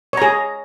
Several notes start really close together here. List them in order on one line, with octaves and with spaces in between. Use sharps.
C#5 A#5 G#4